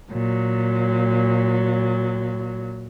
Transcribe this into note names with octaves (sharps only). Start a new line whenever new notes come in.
A#2 F#3